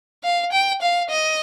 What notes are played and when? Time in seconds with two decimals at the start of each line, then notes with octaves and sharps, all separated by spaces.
0.24 F5
0.52 G5
0.82 F5
1.10 D#5